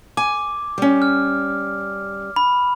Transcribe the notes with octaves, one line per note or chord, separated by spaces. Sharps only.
G#5 D6
G3 C#4
F6
B5